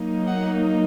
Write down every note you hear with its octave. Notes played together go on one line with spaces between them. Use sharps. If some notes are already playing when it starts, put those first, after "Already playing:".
Already playing: F#3 A#3 D#4
F#5